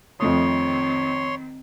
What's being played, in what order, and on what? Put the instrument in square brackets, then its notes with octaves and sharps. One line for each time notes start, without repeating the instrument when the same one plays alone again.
[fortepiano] F2 A3 D#6 [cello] D#3 C4 [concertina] C#5 C6